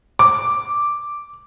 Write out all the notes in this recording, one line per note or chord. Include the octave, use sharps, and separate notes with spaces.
D6